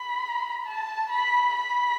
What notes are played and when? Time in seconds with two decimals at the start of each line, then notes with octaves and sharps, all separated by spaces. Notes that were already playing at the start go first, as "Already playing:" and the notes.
Already playing: B5
0.66 A5
1.10 B5
1.54 B5